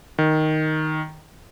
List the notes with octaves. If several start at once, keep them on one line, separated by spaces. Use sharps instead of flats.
D#3